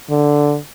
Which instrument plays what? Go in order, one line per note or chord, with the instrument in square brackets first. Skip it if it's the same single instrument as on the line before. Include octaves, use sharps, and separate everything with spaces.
[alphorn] D3